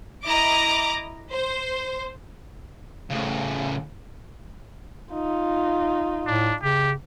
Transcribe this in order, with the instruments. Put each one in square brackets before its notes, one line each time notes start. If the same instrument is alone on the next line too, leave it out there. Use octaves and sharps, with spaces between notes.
[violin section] E4 D#5 A#5 D6
C5
[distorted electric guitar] A2 C#3
[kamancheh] D#4 F4
[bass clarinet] A2 [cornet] D4
[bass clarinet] C#3 [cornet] G4